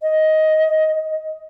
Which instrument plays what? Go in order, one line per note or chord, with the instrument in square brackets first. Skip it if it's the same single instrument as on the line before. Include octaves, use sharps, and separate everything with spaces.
[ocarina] D#5